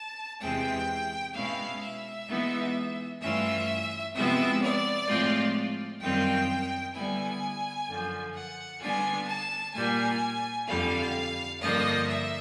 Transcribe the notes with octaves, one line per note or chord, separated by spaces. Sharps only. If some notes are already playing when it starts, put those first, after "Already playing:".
Already playing: A5
E2 C3 E3 G#3 C4 G5
B2 G#3 C#4 E4 F5
E5
E3 G#3 B3 D#4
G2 E3 A3 C#4 F4 E5
C3 F3 G#3 B3 E4 E5
D5
A2 F3 G#3 C4 F4
F#2 D#3 G3 C4 F4 G5
D3 G3 B3 E4 G#5
F#2 D3 F3
F#5
D3 G3 B3 D4 F4 G#5
A5
A#2 G3 A#3 G#5
F2 D3 G3 F5
G2 D3 F3 A#3 D#5
E5